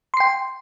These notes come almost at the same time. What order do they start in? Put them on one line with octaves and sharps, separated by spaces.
C6 C7 G5